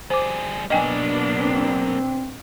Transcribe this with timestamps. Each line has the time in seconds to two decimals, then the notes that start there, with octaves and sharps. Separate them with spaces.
0.10 G3 G#4 C5 D6
0.70 B2 F#3 A#3 B3 D4 D#5 G5 G#5
1.38 C4